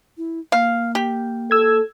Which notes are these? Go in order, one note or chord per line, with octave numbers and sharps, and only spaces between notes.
E4
A#3 F5
G4
A4 E6 G#6